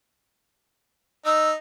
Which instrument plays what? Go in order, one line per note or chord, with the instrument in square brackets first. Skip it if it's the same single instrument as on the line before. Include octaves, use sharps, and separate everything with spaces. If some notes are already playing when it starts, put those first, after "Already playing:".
[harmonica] D#4 [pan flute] E6